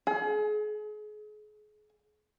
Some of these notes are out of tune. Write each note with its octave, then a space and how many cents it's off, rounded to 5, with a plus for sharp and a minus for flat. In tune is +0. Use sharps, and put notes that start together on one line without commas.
G#4 +35